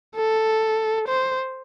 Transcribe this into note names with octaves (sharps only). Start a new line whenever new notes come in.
A4
C5